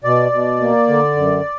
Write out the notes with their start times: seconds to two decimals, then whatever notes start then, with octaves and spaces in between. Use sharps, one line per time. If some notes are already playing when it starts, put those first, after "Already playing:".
0.04 B2 D5
0.32 B2
0.60 A#3
0.88 D3
1.16 F#2